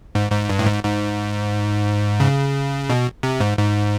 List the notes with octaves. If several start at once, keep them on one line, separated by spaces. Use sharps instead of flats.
G#2
G#2
G2
A2
G#2
G#2
C#3
B2
C3
G#2
G#2